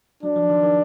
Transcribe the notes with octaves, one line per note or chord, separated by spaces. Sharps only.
F#3 D4
F3
D#3
D#3